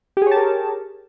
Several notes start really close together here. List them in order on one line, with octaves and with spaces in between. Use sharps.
G4 G#4 C#5 A5 A#4